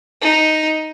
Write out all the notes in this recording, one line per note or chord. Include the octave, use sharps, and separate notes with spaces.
D#4